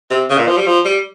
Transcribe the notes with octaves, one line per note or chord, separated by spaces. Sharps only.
C3
C#3
A#2
F3
G3
F3
G3